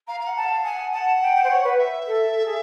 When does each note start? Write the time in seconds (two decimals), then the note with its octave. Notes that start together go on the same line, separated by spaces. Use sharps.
0.07 F5 A#5
0.20 F5
0.26 F#5
0.36 A5
0.45 F5
0.64 F#5 G#5
0.92 F#5 A5
1.21 G5
1.35 G5
1.43 C5
1.50 C#5
1.64 B4
1.78 E5
2.07 A4
2.35 A4
2.45 G#4